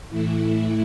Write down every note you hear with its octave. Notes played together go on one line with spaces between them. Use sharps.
A2 E3 A3 E4